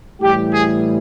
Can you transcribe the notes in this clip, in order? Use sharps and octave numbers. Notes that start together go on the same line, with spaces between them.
A2 E3 G3 G4
G#4